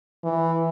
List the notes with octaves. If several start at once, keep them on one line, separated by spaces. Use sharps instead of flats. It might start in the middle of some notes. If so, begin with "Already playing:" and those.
E3